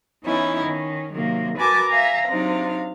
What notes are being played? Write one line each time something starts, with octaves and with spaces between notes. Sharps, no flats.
E3 B3 C#4 D#4 E4
D#3 C#4
C3 D#3 F#3 A#3
F#4 A#4 B4 G#5 A5 D6
E5 F5 G#5 A#5
C3 F#3 D4 D#4 F5